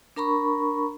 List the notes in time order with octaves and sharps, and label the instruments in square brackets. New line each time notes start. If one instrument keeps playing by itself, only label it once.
[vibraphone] D4 A#4 A#5 B5 C#6